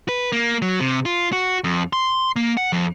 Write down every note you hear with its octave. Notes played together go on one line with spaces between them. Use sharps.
B4
A#3
F#3
C3
F4
F#4
F2
C6
A#3
F#5
F2